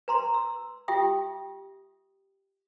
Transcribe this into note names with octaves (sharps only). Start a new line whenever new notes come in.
B4 A#5 C6
E6
F4 G4 E5 G5 D#6